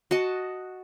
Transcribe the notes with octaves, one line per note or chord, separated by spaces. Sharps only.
F#4 D#5 A5